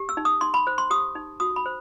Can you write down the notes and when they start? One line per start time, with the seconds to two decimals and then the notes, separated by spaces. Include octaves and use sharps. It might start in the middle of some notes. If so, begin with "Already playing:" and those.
Already playing: G4
0.09 E6
0.17 D#4
0.25 D#6
0.41 D#4 C6
0.54 B5
0.67 C5
0.78 C6
0.90 G4 D#6
1.16 D#4
1.40 F#4 D#6
1.56 B5
1.66 C5